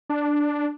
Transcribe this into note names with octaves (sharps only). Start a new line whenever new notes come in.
D4